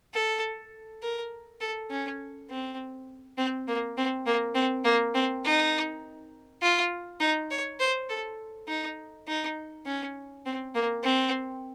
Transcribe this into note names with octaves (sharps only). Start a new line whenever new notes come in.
A4
A#4
A4
C#4
C4
C4
A#3
C4
A#3
C4
A#3
C4
D#4
F4
D#4
C#5
C5
A4
D#4
D#4
C#4
C4
A#3
C4